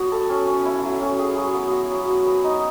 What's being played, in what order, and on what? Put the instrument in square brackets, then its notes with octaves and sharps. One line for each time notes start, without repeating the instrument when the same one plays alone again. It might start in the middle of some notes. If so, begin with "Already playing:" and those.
Already playing: [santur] F#3 A3 B3 F#4
A4
C#4
C#4
E4
F#3
C#4
G#4
F#3
B3
F#4
F#3
F#4
B4
D#4